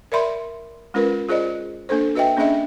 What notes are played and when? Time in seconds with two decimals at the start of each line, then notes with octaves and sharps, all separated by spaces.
0.12 A#4 D5 E5 B5 C6
0.94 G#3 C#4 F4 A#4 B4
1.29 F4 G#4 C5 D5 D#5
1.89 A#3 D4 A4 C5
2.15 F#4 B4 D#5 E5 G5
2.37 A#3 C#4 D4 G#4 D#5 E5